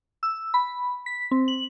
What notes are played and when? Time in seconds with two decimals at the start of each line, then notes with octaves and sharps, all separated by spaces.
0.23 E6
0.54 B5
1.06 B6
1.31 C4
1.48 F#7